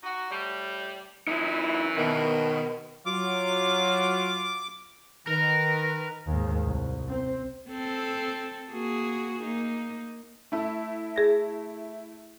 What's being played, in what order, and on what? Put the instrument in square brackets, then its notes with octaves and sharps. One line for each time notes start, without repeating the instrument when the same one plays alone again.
[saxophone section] D#4 F#4
A2 G3
[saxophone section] F#2 E3 [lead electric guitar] D#4 E4
[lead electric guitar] B2 [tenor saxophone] D#3
[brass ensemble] F#3 [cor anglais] F4 [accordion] D6
[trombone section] D#3 [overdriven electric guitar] A#4 [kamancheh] B4 [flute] A#6
[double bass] D#2 G#2
C2
C4
[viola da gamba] C4 A4
A#3 F#4 G#4
A#3 D#4
[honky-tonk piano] A3 E4
[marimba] G#4 A#6